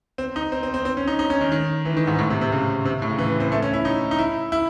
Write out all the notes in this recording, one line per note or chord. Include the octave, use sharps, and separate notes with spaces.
C4
D#4
C4
C4
C4
C4
C#4
D#4
D#4
C#4
D#3
D#3
E3
D#3
G#2
A2
C3
C3
C#3
C3
A2
C#3
E3
C4
A3
C#4
E4
D#4
D#4
E4
E4